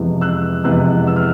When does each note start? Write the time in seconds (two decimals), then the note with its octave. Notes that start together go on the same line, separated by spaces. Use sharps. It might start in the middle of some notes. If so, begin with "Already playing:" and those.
Already playing: F2 C3 E3 G#3 B3
0.21 E6 F#6
0.64 F2 C3 E3 G#3 B3 E6 F#6
1.07 E6
1.16 F6